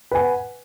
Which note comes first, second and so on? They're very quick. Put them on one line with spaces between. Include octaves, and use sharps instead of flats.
B4 G#5 F#5